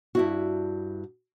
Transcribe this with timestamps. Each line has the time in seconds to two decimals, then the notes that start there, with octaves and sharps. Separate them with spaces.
0.15 G2 E4 F#4